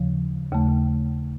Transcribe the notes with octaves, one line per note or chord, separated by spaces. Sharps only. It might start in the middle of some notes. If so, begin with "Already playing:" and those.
Already playing: D#2 C#3 F3
D#2 C#3 A3